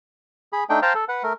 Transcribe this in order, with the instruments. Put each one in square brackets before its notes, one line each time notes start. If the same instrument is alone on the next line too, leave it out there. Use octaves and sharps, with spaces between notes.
[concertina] G#4 B5
A3 D4 D#4 G5
C5 F5 G5 A5 A#5
A4
B4 F#5
A3 A#4